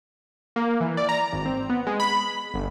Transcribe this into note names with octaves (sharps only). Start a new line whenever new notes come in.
A#3
E3
D5
A#5
G#1
C4
B3
G#3
B5
G1